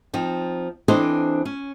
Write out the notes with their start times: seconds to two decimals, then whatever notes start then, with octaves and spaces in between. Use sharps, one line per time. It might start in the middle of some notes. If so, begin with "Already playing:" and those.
0.14 F3 C4 D#4
0.88 E3 C4 D4 A4 C5 D#5
1.45 C#4